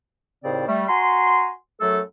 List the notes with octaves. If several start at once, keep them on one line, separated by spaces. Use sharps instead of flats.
D#2 A2 C#3 C4 C5 D5
G3 A3
F#4 G#5 A#5 C6
F#2 F#3 A3 A4